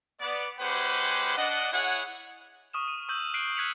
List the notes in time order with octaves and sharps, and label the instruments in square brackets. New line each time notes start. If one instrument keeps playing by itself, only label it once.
[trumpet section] B3 D5
G#3 C#4 G4 B4 C5 F#5
D4 D#5 F#5
E4 G#4 C#5 F#5
[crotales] C#6 D#6 F6 E7
D#7
C#6 D#6 E6 G6 F#7
F6 F#6 C7 D7 F#7
F#6 G#6 B6 C#7 F7 F#7